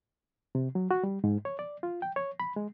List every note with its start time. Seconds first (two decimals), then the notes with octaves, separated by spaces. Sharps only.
0.55 C3
0.75 F#3
0.91 F#4
1.03 G3
1.24 G#2
1.45 C#5
1.59 D5
1.83 F4
2.02 G5
2.16 C#5
2.40 B5
2.56 G#3